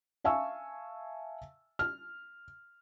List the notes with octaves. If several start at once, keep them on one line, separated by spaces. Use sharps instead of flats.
E5 F5 G#5 A5 C#6 E6
F6